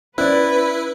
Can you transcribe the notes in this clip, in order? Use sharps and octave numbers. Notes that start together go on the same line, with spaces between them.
B3 C#4 E4 B4 C5 D5